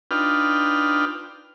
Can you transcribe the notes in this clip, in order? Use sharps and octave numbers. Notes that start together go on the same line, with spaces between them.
D4 D#4 F4 B4 G5 F6